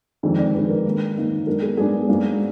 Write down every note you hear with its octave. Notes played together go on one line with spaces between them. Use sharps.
F2 D#3 G#3 D4
D5
F2 D#3 G#3 D4 B4
A#4
G#2 D#3 A#3 D#4
G#2 D#3 A#3 D#4
G#2 F#3 B3 D4 A#4
G#4
G#2 F#3 B3 D4 G#4
G#2 F#3 A#3 D4